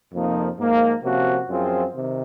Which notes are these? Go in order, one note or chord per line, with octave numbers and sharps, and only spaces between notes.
F2 C3 F3 A#3 D#4
G#2 F3 A#3
C3 F3 A#3 C#4 F#4
F#2 F3 C4 F4 G#4
C3 D#3